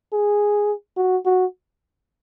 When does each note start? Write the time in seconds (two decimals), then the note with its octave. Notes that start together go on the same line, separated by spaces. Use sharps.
0.13 G#4
0.97 F#4
1.25 F#4